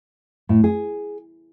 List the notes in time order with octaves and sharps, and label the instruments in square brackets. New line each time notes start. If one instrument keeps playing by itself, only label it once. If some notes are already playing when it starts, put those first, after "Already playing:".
[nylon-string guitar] A2
G#4